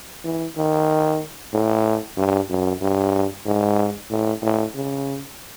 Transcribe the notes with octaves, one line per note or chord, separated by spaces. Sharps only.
E3
D#3
A2
G2
F#2
G2
G#2
A2
A2
C#3